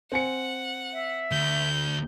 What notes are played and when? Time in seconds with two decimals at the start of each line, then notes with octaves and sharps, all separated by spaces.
0.12 C4 F#5 G#5 C#7
0.93 E5
1.31 D2 G6